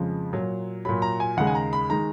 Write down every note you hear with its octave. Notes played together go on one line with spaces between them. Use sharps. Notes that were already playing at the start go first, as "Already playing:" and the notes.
Already playing: F2 C#3 F3 G#3
A#2 F#3
A#2 F#3 B5
A#5
G#5
D#2 C#3 G#3 F#5
G#5
A#5
B5
D#3 G#3 A#5